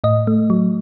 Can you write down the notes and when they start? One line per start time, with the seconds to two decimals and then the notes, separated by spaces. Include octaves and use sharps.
0.04 A2 D#5
0.27 A3
0.50 F#3